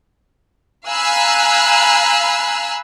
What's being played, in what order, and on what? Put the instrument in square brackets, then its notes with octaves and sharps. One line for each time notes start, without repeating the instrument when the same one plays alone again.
[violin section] F5 G#5 A#5 B5 E6 F#6